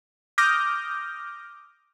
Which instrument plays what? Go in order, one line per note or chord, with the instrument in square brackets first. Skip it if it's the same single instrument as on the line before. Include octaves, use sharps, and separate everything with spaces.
[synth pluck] D6 D#6 F6 G6 A#6